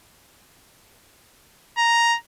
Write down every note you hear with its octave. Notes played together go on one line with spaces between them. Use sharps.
A#5